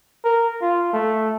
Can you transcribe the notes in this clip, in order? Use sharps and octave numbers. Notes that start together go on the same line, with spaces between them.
A#4
F4
A3